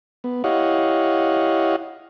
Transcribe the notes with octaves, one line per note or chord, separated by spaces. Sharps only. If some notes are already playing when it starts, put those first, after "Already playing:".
B3
E4 G4 C#5 D#5 F5 F#5